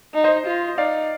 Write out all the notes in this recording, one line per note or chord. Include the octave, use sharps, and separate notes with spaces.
D#4
C5 D#5
F4
D#4 D5 F5